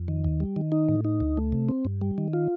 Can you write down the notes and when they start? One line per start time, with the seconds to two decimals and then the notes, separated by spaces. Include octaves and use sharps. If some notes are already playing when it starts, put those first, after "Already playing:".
Already playing: F2
0.08 D#3
0.24 D#2
0.40 G3
0.56 D#3
0.72 D#4
0.89 A2
1.05 D#4
1.20 D2
1.37 A3
1.52 C3
1.69 C4
1.85 G2
2.01 G3
2.18 D#3
2.33 F4